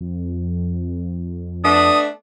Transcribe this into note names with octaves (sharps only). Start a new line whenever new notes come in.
F2
A3 B3 D4 D#6